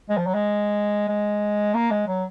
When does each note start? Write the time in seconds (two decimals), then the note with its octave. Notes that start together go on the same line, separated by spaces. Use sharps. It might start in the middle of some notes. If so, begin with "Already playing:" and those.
0.10 G#3
0.18 F3
0.26 F#3
0.34 G#3
1.08 G#3
1.74 A#3
1.91 G#3
2.07 F#3